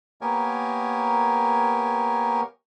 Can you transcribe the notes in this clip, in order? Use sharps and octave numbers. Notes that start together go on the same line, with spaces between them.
A#3 B3 G4 A#4 C#5 G#5